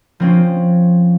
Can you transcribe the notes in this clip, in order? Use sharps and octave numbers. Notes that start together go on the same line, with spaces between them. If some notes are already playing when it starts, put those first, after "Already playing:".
F3 C4 C#4